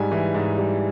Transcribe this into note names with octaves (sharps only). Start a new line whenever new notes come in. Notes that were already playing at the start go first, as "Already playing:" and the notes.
Already playing: G#2 G3 G#5
E3
G#2
G3